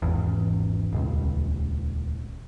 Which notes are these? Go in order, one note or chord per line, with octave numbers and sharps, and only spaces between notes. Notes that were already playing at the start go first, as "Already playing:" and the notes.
G#1 E2
D#1 C#2